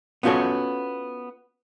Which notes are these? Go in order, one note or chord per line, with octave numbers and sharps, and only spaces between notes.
B3 C#4 F4 F#4 A4 C#5